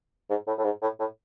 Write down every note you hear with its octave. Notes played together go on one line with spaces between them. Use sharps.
G#2
A2
A2
G#2
A2
A2